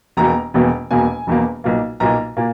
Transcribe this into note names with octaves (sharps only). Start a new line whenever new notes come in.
E1 E2 B2 A#3 A#5
E1 E2 B2 A#3
E1 E2 B2 A#3 G#5
E1 E2 B2 A#3
B1 A#2 A#3
B1 A#2 A#3 A#5
A#2 A#3